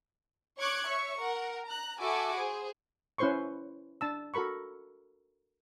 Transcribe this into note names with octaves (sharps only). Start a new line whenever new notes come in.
C#5 C#6 D6 F#6 G#6
C#5 E5 C#6
A#4 F#5
A#5 F#6
F#4 A4 E5 G#5 B5 D6
G#4 C5
C#4 E4 B4 C5 C6 C#6
D4 A5 E6
F#4 A4 A#4 B5 C#6